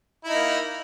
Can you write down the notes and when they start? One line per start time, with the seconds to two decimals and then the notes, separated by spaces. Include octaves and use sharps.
0.24 E4
0.28 D#4
0.32 A#3